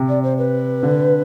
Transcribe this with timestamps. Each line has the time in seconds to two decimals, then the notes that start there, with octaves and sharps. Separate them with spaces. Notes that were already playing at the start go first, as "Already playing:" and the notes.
Already playing: C3
0.09 D5
0.23 C5
0.38 B4
0.83 D3